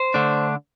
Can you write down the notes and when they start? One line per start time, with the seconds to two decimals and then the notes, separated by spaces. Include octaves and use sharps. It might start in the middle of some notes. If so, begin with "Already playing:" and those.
Already playing: C5
0.14 D3 A3 D4